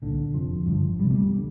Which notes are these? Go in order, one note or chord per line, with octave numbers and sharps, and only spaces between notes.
C2 A#2 D3
F1 F2 C3 F3
G1 G2 D3 F3
D2 C3 G3
A#3
G3
D3